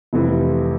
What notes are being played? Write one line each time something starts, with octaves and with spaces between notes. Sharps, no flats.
F1 F2 E3 G3